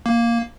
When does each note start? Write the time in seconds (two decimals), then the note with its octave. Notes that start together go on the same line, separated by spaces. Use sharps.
0.06 A#3